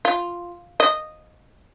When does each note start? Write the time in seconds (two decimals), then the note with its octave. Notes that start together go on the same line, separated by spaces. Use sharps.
0.05 F4
0.80 D#5